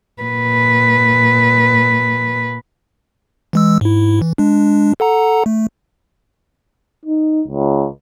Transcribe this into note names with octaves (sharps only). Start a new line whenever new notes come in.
A#2 B4
E3 G#3 E6
G#2 E4
E3
G#3 D4
A4 F#5 A#5
A3
D#4
C#2